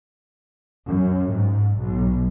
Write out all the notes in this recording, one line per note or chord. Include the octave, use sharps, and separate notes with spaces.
F#2
G#2
B1